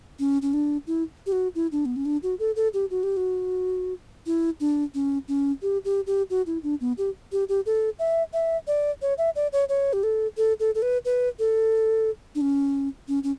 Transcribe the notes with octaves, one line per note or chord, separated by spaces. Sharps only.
C#4
C#4
D4
E4
G4
F#4
E4
D4
B3
C#4
D4
F#4
A4
A4
G4
F#4
G4
F#4
E4
D4
C#4
C#4
G4
G4
G4
F#4
E4
D4
B3
G4
G4
G4
A4
E5
E5
D5
C#5
E5
D5
C#5
C#5
G4
A4
A4
A4
A4
B4
B4
A4
D4
C#4
C#4
C#4